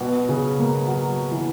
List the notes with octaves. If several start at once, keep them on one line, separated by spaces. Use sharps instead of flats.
B2
C#3
A#3
F#3
E3